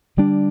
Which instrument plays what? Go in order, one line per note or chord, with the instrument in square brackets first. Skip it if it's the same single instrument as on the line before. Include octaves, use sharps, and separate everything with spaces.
[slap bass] D3 G3 D4